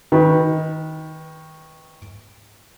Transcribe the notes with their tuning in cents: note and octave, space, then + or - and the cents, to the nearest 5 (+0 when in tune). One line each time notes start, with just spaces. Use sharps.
D#3 +20 B4 -5